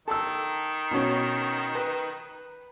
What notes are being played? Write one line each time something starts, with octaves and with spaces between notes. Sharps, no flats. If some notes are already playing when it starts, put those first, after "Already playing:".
D#3 A4 E6
B2 C#4
B4